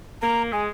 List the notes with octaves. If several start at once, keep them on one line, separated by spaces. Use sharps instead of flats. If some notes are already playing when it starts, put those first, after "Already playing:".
A#3 A#5
G#3 G#5